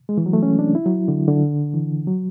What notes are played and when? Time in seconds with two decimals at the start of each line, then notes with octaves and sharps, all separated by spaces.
0.09 G#3
0.18 E3
0.26 F#3
0.33 A3
0.43 C#4
0.59 D4
0.75 E4
0.86 F#3
1.08 D3
1.28 D3
1.74 E3
2.07 F#3